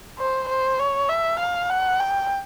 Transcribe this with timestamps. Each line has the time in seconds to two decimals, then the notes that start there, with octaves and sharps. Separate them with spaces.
0.19 C5
0.49 C5
0.79 C#5
1.09 E5
1.40 F5
1.70 F#5
2.00 G5